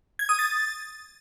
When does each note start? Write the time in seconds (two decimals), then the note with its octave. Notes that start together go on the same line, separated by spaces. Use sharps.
0.19 G#6
0.29 D#6
0.39 A6